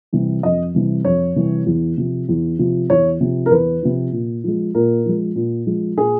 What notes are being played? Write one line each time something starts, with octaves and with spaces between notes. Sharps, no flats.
C3 E3 G3
F2 D#5
C3 E3 G3
F2 C#5
C3 E3 G3
E2
C3 F3
E2
C3 F3
E2 C#5
C3 F3
A#4
E2 B4
C3 F3
A#2
F3 G#3
A#2 A#4
F3 G#3
A#2
F3 G#3
A#2 G#4